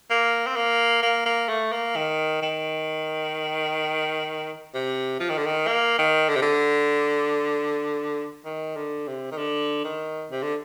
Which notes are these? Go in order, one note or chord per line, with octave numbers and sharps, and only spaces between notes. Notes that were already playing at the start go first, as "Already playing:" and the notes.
A#3
C4
A#3
A#3
A#3
A3
A#3
D#3
D#3
C3
F3
D#3
D3
D#3
A#3
D#3
D3
C3
D3
D#3
D3
C3
D#3
D3
D#3
C3
D3